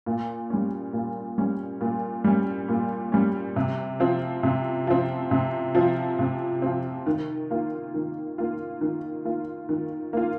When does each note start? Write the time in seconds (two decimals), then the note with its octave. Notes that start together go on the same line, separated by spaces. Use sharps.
0.06 A#2
0.50 G3 C#4
0.93 A#2
1.38 G3 C#4
1.81 A#2
2.24 G3 C#4
2.69 A#2
3.12 G3 C#4
3.56 C3
4.00 F3 C4
4.43 C3
4.87 F3 C4
5.31 C3
5.75 F3 C4
6.19 C3
6.62 F3 C4
7.06 D#3
7.50 A#3 F4
7.94 D#3
8.38 A#3 F4
8.81 D#3
9.25 A#3 F4
9.69 D#3
10.13 A#3 F4